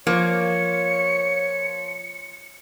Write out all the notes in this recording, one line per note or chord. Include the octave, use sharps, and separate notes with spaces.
F3 A#3 C#5 C#7